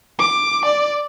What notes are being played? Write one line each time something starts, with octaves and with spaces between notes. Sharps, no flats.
D6
D5